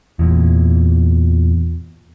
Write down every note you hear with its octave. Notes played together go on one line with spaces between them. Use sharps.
E2 A#2